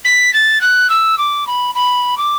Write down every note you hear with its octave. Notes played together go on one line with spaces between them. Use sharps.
B6
A6
F#6
E6
D6
B5
B5
D6